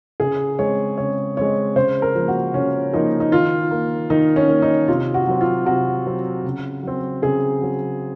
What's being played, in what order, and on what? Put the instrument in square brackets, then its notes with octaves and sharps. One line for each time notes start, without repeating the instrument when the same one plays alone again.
[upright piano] C#3 G#4
G#3 C4 C#5
C#3 C#5
G#3 C4 C#5
C#3 C5
A#4
F3 A#3
F#4
C#3 C#4
F3 A#3 D#4
D#4
D#3 F4
A#3
D#3 D#4
C#4
A#3
D#4
C3 F4
F#4
F#3 C4
F4
C3 F#4
F#3 C4
C#3
F#3 C4
C#3 G#4
F#3 C4